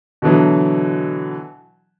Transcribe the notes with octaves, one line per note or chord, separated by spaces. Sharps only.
B2 D3 E3 F#3